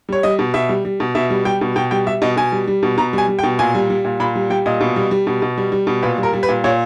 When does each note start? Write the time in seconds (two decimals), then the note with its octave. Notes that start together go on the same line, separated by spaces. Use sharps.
0.09 G3 C#5
0.23 G3 D#5
0.39 B2
0.54 B2 E5
0.69 G3
0.85 G3
1.00 B2
1.15 B2 E5
1.30 G3
1.45 G3 G5
1.61 B2
1.76 B2 G5
1.91 G3 G5
2.06 G3 E5
2.22 B2 D#5
2.37 B2 G#5
2.52 G3
2.67 G3
2.83 B2
2.98 B2 A#5
3.13 G3 G#5
3.28 G3
3.39 G5
3.43 B2
3.59 A#2 G#5
3.75 G3
3.90 G3
4.05 A#2
4.20 A#2 B5
4.35 G3
4.50 G3 G5
4.66 A#2 D#5
4.81 B2
4.96 G3
5.11 G3
5.27 B2
5.42 B2
5.58 G3
5.72 G3
5.87 B2
6.03 A#2 B4
6.18 G3
6.23 A#4
6.33 G3
6.43 B4
6.49 A#2
6.64 A#2 C#5